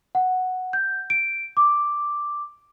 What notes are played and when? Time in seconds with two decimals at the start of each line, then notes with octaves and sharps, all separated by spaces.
0.15 F#5
0.73 G6
1.10 D7
1.57 D6